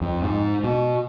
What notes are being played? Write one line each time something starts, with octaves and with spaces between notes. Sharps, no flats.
F2
G#2
B2